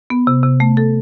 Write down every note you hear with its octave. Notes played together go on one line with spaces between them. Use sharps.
B3
C3
C3
A3
A4